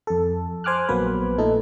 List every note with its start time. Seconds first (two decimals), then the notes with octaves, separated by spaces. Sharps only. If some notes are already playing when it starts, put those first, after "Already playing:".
0.07 F2 A4
0.64 C5 G#5 D6 F6 F#6
0.89 A#1 F#3 A#3 B3 B4
1.38 A#2 A3 D#4 A4